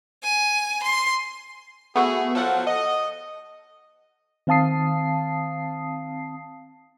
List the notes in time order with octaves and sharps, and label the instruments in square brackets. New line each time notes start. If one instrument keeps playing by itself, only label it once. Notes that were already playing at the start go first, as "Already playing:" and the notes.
[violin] G#5
C6
[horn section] A3 G#4 [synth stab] B3 F#4
[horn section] F3 F#3 [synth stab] A4 F#5
[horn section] D#5
[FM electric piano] D#3 C4 F5 A5 D#6 C7